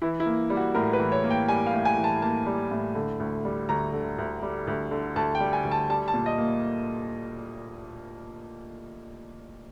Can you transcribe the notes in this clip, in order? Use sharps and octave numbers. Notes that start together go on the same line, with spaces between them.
E3 E4
E4
A#3
G3
F#4
A2 A#4
B4
E3
C#5
A#3
G5
G3 G#5
F5
A2
G#5
E3
A5
A#3 A5
G3
A2
D3
D2
G3
D2 A#5
D3
D2
G3
D2
D3
D2 A5
G5
G3
G#5
D2
A5
G3 A5
A5
A#2
D#5
A#3